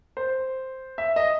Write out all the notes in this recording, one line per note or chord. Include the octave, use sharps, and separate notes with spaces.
C5
E5
D#5